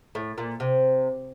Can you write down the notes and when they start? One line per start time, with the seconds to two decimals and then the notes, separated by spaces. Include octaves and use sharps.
0.15 A2
0.38 A#2
0.60 C3